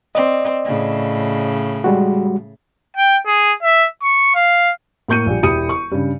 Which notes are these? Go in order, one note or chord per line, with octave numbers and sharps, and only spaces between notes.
C4 D5 D#5
A2 C#3
G3 G#3 F#4
G5
G#4
E5
C#6
F5
A2 A#3 C#6 G6 C#7 D#7
A#1 G3
E1 E4 G4 D#6 C#7 D#7
C#6
G2 C#3